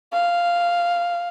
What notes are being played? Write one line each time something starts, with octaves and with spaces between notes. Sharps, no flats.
F5